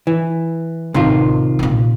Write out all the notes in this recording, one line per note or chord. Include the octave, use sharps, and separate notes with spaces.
E3
A1 C3 D#3 F4
A#2 C#3